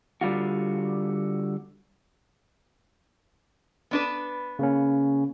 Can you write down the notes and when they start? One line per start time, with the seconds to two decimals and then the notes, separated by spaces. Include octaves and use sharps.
0.21 D3 G3 F4 F#4
3.91 B3 D4 B4
4.59 C#3 A#3 C#4